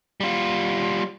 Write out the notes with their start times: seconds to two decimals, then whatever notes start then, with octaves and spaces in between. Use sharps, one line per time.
0.20 G3 F4